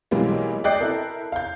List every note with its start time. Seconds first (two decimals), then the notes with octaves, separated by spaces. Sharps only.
0.11 B1 E3 G3 G#3 A#3
0.64 D5 D#5 G5 F#6 G6 C7
0.80 E4 A4 A#4
1.32 F5 G6